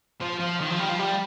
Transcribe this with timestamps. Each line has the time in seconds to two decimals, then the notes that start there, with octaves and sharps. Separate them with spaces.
0.21 F3
0.40 F3
0.61 D#3
0.70 F3
0.79 G3
0.89 F3
0.99 G3